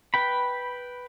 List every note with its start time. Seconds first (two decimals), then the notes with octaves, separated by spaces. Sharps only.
0.14 B4 G5 B5